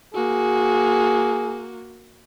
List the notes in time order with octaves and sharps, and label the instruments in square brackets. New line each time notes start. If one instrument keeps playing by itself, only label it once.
[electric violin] A#3 F#4 [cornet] G#4